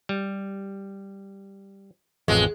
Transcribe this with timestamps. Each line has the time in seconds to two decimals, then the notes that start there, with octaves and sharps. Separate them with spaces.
0.09 G3
2.28 A1 F2 G#3